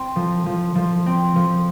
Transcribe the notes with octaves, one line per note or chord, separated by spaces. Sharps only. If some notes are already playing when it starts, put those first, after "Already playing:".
Already playing: C4
F3
F3
F3
C4
F3